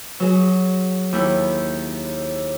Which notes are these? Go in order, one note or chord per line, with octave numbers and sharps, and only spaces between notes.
F#3 G#4
D#2 E4